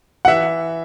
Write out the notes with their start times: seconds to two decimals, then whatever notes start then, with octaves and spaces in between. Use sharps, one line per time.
0.25 F#5
0.28 E3 E5